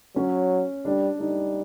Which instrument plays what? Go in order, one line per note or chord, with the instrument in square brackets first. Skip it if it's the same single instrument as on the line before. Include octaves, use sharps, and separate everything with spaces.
[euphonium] F#3 [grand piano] C#4
[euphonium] G3 [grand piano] D4
[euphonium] G3 [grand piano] D#4